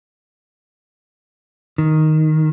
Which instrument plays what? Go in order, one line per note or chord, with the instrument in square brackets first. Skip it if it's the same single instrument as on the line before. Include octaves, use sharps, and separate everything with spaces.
[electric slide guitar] D#3